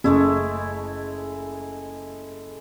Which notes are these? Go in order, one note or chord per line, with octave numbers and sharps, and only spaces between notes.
F#1 G#3 A3 E4